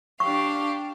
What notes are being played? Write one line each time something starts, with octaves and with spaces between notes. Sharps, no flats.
D4 G4 F5 C#6